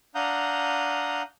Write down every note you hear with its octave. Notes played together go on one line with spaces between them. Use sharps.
D4 F5 F#5 A#5 D#6 G6